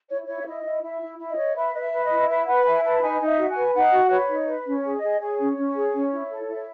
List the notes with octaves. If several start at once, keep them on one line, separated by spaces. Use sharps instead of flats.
E4 C#5
E4 C#5
E5
E4 D#5
E4
E4 E5
E4
E4
D#5
C#5
B4 E5
B4 D#5
E5
B4
D#5
E4
B4 E5
B4 F#5
E4 G#5
B4 A5
D#4 G#5
D#4
E5
F#4
G#5
B4
D#4 F#5
F#4
B4 C#5
D#4
B4
C#4
C#5
G#4
D#5
G#4
G#4 C#5
C#4
C#4
G#4
C#4
E4
A4
E4
C#5